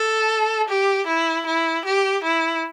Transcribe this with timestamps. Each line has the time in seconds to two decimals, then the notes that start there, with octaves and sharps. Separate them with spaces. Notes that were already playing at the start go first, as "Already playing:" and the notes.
Already playing: A4
0.69 G4
1.07 E4
1.46 E4
1.85 G4
2.24 E4